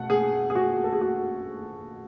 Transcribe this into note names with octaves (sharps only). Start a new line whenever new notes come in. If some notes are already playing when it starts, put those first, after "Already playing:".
Already playing: B2 A3 F#5
G#4
G#4
F#4
A4
G#4
F#4